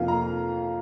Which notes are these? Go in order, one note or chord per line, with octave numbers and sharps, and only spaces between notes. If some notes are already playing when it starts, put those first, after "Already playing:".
Already playing: F2 C3 F3 A#3 F5
A#5